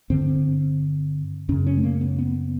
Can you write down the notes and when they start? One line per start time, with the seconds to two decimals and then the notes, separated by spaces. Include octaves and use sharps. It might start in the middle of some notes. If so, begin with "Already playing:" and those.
0.10 G2 D3 C4
1.49 F#2 C#3 C#4
1.67 C#4
1.77 A3
1.84 A#3
2.01 B3
2.19 B3